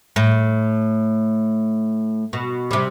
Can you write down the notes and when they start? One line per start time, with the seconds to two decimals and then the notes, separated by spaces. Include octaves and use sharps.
0.16 A2
2.33 B2
2.71 C3 G3